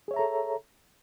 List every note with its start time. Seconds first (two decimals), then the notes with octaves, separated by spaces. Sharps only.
0.08 G#4
0.11 C#5
0.14 E5
0.16 A#5
0.19 A4